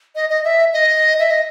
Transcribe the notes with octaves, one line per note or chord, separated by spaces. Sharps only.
D#5
D#5
E5
D#5
E5
D#5